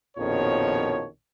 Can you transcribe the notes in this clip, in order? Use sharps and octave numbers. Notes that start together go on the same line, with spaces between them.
A#1 F2 B2 D#3 F3 C#5